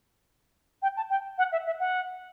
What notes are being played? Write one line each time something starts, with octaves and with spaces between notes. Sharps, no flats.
G5
A5
G5
F#5
E5
E5
F#5